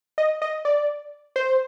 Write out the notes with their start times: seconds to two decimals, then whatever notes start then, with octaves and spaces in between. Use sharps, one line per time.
0.18 D#5
0.42 D#5
0.65 D5
1.36 C5